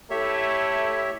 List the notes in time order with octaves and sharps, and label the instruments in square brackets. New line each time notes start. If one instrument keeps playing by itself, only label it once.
[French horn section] A3 [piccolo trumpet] E4 [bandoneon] G4 C#5 E5